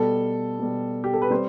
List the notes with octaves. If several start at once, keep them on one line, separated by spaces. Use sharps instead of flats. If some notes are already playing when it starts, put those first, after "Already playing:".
Already playing: B2 G3 A4
B2 G3
G4
A4
B4
G3 C4 C5